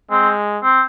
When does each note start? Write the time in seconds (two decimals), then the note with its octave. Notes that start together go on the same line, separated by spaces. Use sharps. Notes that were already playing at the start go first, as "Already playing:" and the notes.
0.11 G#3 C4
0.63 C4